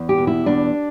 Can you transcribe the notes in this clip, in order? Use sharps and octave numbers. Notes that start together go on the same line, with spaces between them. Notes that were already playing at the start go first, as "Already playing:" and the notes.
Already playing: E2
G4
B2
E4
E2 D4